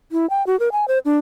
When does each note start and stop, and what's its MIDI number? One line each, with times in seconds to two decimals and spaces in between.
0.12 0.29 64
0.30 0.45 79
0.47 0.58 66
0.60 0.69 70
0.72 0.88 80
0.88 0.99 72
1.05 1.18 62